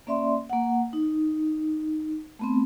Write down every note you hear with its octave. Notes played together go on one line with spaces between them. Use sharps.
A#3 C#4 D5 E5 C6
A#3 F#5
D#4
A3 B3 C4